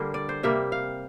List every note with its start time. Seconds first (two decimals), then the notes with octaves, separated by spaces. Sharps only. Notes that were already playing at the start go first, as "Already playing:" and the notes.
Already playing: D3 G3 A#3
0.14 D5
0.29 C5
0.43 C3 G3 A#3 E5
0.72 F5